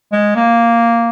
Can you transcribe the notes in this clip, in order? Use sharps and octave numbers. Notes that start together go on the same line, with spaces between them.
G#3
A#3